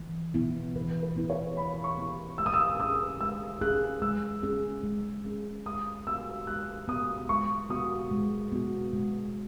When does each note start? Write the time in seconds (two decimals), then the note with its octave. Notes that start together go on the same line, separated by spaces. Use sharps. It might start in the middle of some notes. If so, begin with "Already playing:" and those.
Already playing: E3
0.34 B3 E4
0.76 E3 B4
1.03 B4
1.16 B3 E4
1.30 C#5
1.57 E3 B5
1.84 C#6
1.98 B3 E4
2.38 G#3 E6
2.46 D#6
2.54 E6
2.80 C#4 G#4 D#6
3.20 G#3 E6
3.61 C#4 G#4 F#6
4.02 G#3 E6
4.43 C#4 G#4
4.83 G#3
5.25 C#4 G#4
5.66 G#3 D#6
6.07 B3 F#4 E6
6.47 G#3 F#6
6.88 B3 F#4 D#6
7.29 G#3 C#6
7.70 B3 F#4 D#6
8.11 G#3
8.52 B3 F#4
8.93 G#3